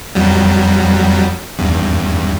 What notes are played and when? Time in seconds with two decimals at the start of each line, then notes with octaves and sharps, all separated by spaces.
0.15 F2 F#3 G3
1.59 E2 G2